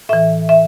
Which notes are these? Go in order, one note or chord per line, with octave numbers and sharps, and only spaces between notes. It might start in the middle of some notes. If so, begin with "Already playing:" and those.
A2 E3 E5
E5